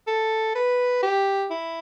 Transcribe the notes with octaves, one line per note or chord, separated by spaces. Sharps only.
A4
B4
G4
E4